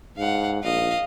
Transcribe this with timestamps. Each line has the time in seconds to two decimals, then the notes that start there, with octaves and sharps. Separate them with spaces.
0.17 G#2 F5 F#5
0.64 A#1 D#5 F5